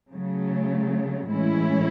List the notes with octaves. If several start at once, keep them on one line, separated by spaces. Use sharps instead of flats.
C#3 F#3 A3
A2 E3 G#3 C#4 E4